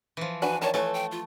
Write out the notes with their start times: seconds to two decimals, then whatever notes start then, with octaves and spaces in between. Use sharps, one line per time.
0.17 E3 F3
0.42 D4 F#4 B4 G#5
0.62 D#3 C#5 D5 A5
0.74 E3 A3 A4 B4 C#5
0.94 G5
1.11 F4